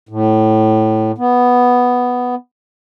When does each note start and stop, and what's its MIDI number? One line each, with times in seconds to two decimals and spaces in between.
0.09 1.12 45
1.18 2.35 59